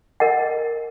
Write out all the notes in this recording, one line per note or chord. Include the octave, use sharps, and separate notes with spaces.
A#4 D#5 F#5